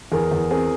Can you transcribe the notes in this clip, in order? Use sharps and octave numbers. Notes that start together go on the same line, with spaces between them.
E2 G#4 A#4
E2
C4 G#4 A#4